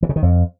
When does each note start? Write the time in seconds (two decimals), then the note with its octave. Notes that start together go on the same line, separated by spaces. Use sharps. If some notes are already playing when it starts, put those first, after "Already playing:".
0.03 E3
0.09 C#3
0.16 D#3
0.23 F2